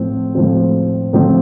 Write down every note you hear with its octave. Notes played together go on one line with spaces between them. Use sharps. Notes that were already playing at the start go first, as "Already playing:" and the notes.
Already playing: A2 F3 C4
A2 F3 C4
A2 F3 C4